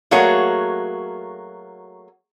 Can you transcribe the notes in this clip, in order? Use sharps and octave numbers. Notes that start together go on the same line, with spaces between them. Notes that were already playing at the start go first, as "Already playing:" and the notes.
F#3 A3 A#3 F#4 G#4 C#5